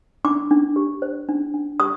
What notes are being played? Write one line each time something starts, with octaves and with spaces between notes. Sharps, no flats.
D4 D6
D4
G4
C5
D4
D4
G4 D#6